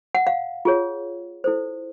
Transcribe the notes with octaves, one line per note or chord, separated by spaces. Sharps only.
F#5
F5
F4 G#4 C#5
E4 A4 C5